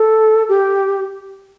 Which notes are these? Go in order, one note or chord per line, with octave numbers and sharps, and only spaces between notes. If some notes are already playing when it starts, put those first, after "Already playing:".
Already playing: A4
G4